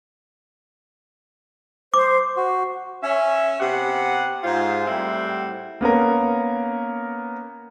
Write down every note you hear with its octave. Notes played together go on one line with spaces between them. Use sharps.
C5 D6
F#4
C#4 E5
C3 B3 G4 F#5
G#2 F4 C5
A2 G3 C4 E4 F#5 G5
A#3 B3 C#4 A#4